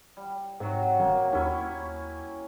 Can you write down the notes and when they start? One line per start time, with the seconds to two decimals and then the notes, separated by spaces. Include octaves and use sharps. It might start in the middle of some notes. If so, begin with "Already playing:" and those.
0.17 G3
0.60 G#2 C3 F#3 F#4
1.00 D#1 A#3
1.33 D#2 C#4 E4 C#6